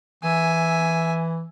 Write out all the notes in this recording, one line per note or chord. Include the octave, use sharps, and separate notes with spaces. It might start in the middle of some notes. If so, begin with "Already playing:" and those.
E3 E5 G#5